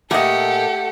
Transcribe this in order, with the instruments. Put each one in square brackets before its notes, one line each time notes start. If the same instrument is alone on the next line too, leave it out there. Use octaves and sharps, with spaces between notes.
[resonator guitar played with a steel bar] A#2 D#5 [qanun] A3 [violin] G4 A4 [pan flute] F#5